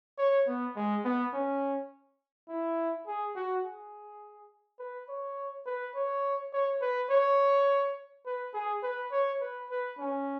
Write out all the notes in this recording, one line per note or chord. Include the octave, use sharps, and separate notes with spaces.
C#5
B3
G#3
B3
C#4
E4
G#4
F#4
G#4
B4
C#5
B4
C#5
C#5
B4
C#5
B4
G#4
B4
C#5
B4
B4
C#4